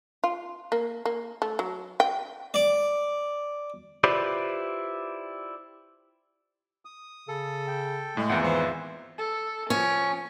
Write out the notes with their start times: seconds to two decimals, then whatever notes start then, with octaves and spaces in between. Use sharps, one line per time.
0.24 F4
0.72 A#3
1.05 A#3
1.42 A3
1.59 F#3
2.00 G5
2.54 D5
4.04 E4 F4 G4 B4 C5 D5
6.85 D#6
7.28 C#3 A4
7.68 G5
8.17 A2 G#3
8.29 G#1 E2 F4 E5 F#5 G5
8.44 E3 C5
9.18 A4
9.70 F3 C#4